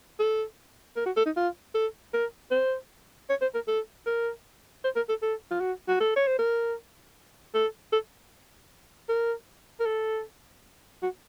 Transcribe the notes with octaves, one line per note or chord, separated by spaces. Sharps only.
A4
A#4
F#4
A4
D#4
F4
A4
A#4
C5
C#5
C5
A#4
A4
A#4
C5
A#4
A4
A4
F4
F#4
F#4
A4
C#5
C5
A#4
A4
A4
A#4
A#4
A4
F#4